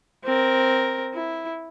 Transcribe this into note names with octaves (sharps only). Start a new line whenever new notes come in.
C4 A#4
E4